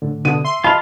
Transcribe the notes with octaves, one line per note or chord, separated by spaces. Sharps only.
A2 D3
B2 D3 D#6 D#7
E5 C6
F4 D#5 F5 A5 B5